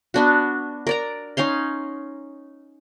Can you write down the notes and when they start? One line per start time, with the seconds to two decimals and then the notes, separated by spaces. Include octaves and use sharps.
0.14 B3 D4 F#4
0.87 A#4 D5 A#5
1.37 C#4 D#4 F5 C6